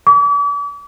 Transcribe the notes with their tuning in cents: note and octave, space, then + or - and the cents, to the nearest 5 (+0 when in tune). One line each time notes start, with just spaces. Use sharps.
D6 -40